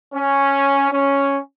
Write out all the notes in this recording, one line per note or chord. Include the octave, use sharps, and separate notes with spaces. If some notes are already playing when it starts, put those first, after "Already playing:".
C#4
C#4